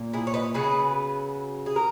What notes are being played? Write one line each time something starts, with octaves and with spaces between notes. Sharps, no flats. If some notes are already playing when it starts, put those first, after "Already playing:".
Already playing: A#2 A#3
E4 G#4
C#5
B4 D#5
C#3 F#3 B3 G#4 B4
G#4
A#4